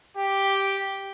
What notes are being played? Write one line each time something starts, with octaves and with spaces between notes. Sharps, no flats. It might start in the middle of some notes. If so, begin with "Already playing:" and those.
G4